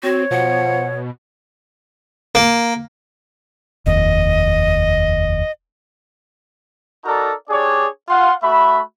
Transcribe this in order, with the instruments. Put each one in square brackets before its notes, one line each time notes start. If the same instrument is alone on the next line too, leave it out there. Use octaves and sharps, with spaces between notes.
[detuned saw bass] C4 [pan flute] F#4 [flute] C#5
[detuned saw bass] B2 [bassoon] F3 [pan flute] F#5
[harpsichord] A#3
[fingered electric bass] F1 D#2 [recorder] D#5
[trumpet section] D#4 F#4 A4 A#4 D5 A#5
D4 G4 G#4 C#5 D5
F4 F#5 C6
A3 F#4 E5 B5